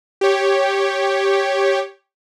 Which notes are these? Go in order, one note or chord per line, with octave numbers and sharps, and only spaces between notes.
G4 C#5